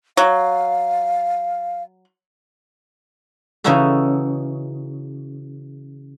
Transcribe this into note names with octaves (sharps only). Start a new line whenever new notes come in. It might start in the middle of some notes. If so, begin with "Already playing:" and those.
F#3 F5
C#3 E3 D#4 E4 F#4 A4